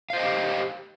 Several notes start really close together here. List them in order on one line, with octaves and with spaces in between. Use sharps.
F5 C5 D#5 G5 G4